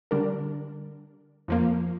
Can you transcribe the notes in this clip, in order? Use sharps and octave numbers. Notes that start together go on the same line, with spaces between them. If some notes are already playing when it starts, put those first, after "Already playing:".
D3 G3 D4 A#4
F2 F3 A#3